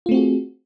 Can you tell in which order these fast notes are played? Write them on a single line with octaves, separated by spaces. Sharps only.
F4 A3 C4 F#4 G#4